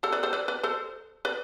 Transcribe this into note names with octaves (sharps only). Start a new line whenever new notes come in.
A4 C5
B4 D5
A4 C5
B4 D5
B4 D5
A4 C5
B4 D5